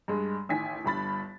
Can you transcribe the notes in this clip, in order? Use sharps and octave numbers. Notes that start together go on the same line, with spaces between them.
G2 G#3
A1 D#3 G#5 B6
G1 G2 B5 A6